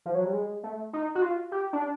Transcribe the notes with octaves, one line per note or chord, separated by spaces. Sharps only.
F3
F#3
G3
G#3
A3
D#4
F#4
F4
G4
D4